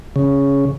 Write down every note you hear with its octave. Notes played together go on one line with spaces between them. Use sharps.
C#3